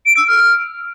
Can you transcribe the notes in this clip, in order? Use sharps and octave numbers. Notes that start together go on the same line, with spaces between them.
D7
E6
F6